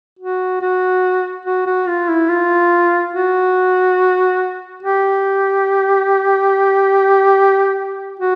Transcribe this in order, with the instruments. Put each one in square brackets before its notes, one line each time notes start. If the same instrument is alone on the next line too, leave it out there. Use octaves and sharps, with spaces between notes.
[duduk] F#4
F#4
F#4
F#4
F4
E4
F4
F#4
G4
F#4